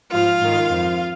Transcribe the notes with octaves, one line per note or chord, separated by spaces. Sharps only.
G#2 F3 F4 F5
G#2 D#3
F2 F3